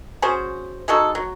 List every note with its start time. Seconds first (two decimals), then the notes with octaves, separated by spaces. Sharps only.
0.22 C#4 F#4 G#4 C5
0.88 G#3 D#4 F#4 A4
1.15 F#3